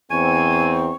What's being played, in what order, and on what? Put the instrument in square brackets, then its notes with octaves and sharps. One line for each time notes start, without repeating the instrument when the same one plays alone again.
[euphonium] E2 [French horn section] C4 [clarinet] G#5 [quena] C#6